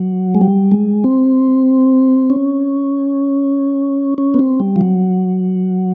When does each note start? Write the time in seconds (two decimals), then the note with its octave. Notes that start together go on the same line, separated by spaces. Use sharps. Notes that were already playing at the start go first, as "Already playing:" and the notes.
Already playing: F#3
0.35 G#3
0.41 G3
0.72 G#3
1.04 C4
2.30 C#4
4.18 C#4
4.34 B3
4.39 C4
4.60 G3
4.76 F3
4.81 F#3